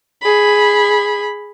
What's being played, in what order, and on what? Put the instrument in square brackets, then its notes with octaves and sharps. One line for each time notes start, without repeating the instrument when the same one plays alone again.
[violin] G#4 B5